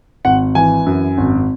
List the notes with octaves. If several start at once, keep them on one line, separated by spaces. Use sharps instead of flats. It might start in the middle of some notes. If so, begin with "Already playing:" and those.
G#1 F#5
E3 G#5
F#2
G#1